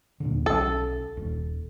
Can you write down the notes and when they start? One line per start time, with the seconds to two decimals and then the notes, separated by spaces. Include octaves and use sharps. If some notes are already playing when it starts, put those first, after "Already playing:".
0.20 D#2 A#2 D3
0.46 B1 C#4 A4
1.17 D#1